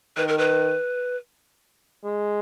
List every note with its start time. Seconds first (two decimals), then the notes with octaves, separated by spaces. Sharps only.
0.17 D#3 B4
0.28 A#4
0.38 B4
2.04 G#3